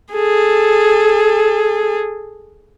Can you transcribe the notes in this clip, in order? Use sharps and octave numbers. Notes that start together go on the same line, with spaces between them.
G#4 A4